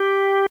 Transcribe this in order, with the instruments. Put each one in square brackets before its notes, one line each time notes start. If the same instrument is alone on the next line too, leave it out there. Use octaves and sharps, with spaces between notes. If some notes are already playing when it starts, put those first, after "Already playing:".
Already playing: [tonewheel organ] G4